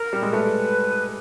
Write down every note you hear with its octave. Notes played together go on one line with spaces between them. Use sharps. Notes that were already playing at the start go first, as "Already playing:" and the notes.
Already playing: A#4
G3
G#3
A3 B4